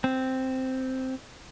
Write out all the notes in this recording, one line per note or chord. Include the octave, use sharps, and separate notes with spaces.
C4